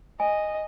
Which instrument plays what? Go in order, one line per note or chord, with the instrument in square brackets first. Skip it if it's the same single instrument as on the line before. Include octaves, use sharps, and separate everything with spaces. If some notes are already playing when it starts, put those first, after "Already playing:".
[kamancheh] D#5 [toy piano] G#5